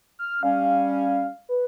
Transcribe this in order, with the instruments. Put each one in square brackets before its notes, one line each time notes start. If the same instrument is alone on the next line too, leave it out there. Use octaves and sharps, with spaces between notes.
[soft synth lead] F6
[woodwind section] G3 C#4 [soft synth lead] F5
[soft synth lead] B4